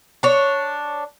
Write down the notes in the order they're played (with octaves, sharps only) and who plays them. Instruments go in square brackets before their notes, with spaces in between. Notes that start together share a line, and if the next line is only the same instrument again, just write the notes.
[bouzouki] D4 C#5